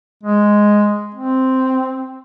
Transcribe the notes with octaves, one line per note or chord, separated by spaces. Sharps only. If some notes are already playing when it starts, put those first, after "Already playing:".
G#3
C4